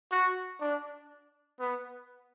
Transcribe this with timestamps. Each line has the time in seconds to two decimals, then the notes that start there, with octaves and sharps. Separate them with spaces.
0.12 F#4
0.61 D4
1.60 B3